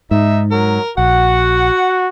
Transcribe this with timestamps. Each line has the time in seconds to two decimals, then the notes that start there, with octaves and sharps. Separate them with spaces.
0.11 G#2 D#4 E5
0.52 F#3 A#4
0.98 A#1 F#4 F#5